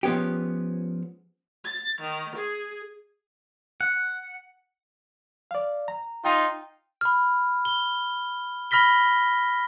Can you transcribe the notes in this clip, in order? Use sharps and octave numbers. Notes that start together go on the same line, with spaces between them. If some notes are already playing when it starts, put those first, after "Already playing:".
F3 G#3 B3 C#4 G4
A6
D#3
G#4
F#5
D5 F5
A#5
D#4 F4 G5
B5 F6
G7
B5 F6 A#6 B6 G7